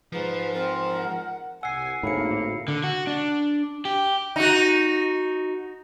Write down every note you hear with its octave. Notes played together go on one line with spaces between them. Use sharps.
G#2 F3 B4
C4 A#4
F#5
C2 F#5 G#5 E6 C7
G#1 D2 A2 A#3 D#4 F5 B5 C#7
D3
F#4
D4
G4
D#4 F#4